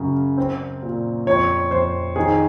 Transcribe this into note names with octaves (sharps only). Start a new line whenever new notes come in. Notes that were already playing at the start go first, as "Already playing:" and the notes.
Already playing: F#2 C#3
C4
A#2
F2 C#5
F2 C5
D#3 G#4